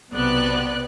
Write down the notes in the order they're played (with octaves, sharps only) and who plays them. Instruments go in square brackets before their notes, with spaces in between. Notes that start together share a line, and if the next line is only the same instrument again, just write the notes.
[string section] B1 C3 B3 D5 F#6